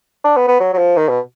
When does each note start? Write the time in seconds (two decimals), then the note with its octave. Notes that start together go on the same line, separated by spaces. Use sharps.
0.24 D4
0.37 B3
0.47 B3
0.60 F#3
0.74 F#3
0.78 F3
0.97 D#3
1.09 B2